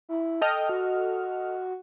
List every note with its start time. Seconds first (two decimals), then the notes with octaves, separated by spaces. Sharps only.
0.09 E4
0.42 A4 D#5 G5 F6
0.69 F#4